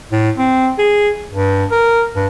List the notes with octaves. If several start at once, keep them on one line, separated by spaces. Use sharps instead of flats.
A2
C4
G#4
G2
A#4
G2